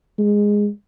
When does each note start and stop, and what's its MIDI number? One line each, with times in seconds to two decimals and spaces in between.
0.19 0.69 56